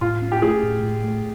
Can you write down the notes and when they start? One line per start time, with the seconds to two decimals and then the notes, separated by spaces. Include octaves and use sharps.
0.01 A2 F4
0.22 C#4
0.32 G4
0.42 A3 G#4
0.63 A2
0.83 A2
1.04 A3